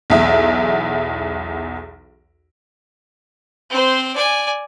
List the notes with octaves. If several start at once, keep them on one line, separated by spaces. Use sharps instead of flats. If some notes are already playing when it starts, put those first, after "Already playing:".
B1 E2 E5
C4 C5
D5 G#5